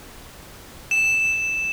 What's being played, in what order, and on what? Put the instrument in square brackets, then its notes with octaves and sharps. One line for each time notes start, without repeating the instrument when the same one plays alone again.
[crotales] E7